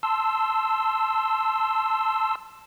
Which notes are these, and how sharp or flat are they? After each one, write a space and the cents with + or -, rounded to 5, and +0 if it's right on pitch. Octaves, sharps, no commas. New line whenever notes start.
A5 +0 C6 +0 E6 +0